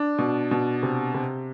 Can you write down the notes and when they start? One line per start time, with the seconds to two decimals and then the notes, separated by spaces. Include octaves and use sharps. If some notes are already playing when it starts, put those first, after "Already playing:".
Already playing: D4
0.18 B2
0.51 B2
0.83 C3
1.14 C3